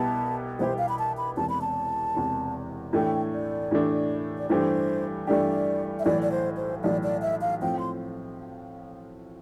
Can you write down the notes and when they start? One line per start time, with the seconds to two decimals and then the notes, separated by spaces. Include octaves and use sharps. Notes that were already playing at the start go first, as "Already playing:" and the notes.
Already playing: C2 B2 B3 E4 G4 A5
0.59 C2 B2 B3 E4 G4 C5
0.78 F5
0.89 B5
0.99 A5
1.17 B5
1.37 E1 E2 C3 A5
1.49 B5
1.61 A5
2.15 E1 E2 C3
2.93 A2 E3 A3 D4 G5
3.33 D5
3.71 A2 E3 A3 D4
4.38 D5
4.50 G2 E3 A3 D4 G4 C5
5.27 G2 E3 A3 D4 G4 D5
5.99 E5
6.05 B1 A2 E3 D5
6.22 D5
6.31 C5
6.57 C5
6.83 B1 A2 E3 D5
7.03 D5
7.22 E5
7.41 F5
7.62 A2 F3 C4 G5
7.79 C6